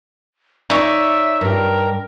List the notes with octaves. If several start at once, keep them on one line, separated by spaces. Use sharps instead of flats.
D#4 C#5 D5 E5
G2 G4 A#4